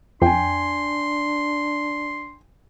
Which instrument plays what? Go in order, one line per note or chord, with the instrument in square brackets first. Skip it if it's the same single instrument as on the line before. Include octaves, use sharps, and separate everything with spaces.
[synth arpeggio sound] F2 [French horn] D4 [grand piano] G5 G#5 [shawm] C6